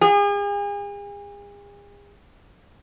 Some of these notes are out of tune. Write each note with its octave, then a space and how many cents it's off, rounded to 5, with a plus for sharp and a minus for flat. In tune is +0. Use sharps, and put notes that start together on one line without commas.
G#4 -40